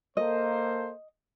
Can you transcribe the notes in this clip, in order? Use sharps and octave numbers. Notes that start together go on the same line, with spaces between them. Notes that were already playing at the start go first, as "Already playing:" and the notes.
A#3 A4 C5 D#5